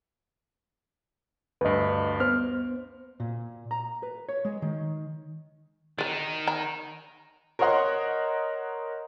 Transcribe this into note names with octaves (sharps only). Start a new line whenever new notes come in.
D2 G2 B4 D#5
B3 C5 F6
A#2
A#5
B4
C#5
G#3
D#3
D#3 D#4 B4 D5
A#5 B5
A#4 C5 C#5 D#5 F#5 C6